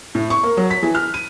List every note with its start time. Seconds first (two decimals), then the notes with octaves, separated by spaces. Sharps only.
0.15 A2
0.30 C#6
0.43 A#3
0.57 F#3
0.70 B6
0.83 E3
0.95 F6
1.14 D#7